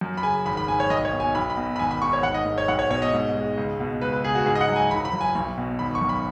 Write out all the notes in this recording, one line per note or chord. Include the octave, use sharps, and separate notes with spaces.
F#2
B5
C#3 G#5
G#1 B5
B5
G#2 G#5
C#5
B1 D#5
C#5
B2
G#5
B1 B5
B5
B2
B5
G#1 G#5
B5
G#2 C#6
C#5
G#1 F#5
D#5
G#2
C#5
B1 F#5
C#5
B2 C#5
D#5
G#2
G#3
C#2
B2
C#2 B4
B4
C#3 G#4
F#4
G#2 G#4
D#5
F#5
F#3
G#5
F#1 B5
B5
F#2
G#5
B1
B2
G#1 B5
C#6
F#2
B5